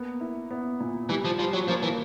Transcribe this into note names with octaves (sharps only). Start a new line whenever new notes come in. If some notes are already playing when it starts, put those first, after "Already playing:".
Already playing: A#3 B3
E4
B3
A#2
E3 G3
F3
F3 G3
F#3
F3 A#3
E3